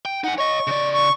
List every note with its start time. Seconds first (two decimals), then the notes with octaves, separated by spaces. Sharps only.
0.05 G5
0.24 D#4 F#5 G#5
0.38 C#5 D#5 C#6
0.67 C#3 D5
0.93 C#6